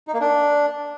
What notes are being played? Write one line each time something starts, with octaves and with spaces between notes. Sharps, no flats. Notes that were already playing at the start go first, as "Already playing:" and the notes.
D#4
A#3
D4